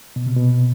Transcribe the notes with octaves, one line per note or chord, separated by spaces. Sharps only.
B2
C3
B2